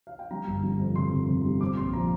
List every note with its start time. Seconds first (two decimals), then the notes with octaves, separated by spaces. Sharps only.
0.07 F5
0.19 G5
0.31 G3 A#5
0.47 G1
0.63 G3
0.80 F2
0.95 C3 C6
1.12 C3
1.28 C3
1.44 G3
1.60 C4 D6
1.77 A#1 C6
1.93 F3 A#5